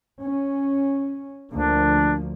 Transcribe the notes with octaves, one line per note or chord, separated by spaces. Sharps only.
C#4
D2 F3 A#3 D4